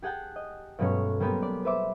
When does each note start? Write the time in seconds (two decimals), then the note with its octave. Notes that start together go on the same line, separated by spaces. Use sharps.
0.02 G4 G#4 F#5 G5 A5
0.36 D#5
0.79 G2 B2 F#3 G#3 A3 C#4
1.20 G3 G#3 A#3 B3 G4 B4
1.42 D5
1.65 B4 C5 E5 D6